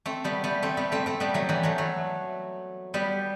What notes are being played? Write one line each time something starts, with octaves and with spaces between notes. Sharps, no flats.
A3 C4
G3 B3
G3 B3
A3 C4
G3 B3
A3 C4
A3 C4
G3 B3
F#3 A3
E3 G3
F#3 A3
F#3 A3
G3 B3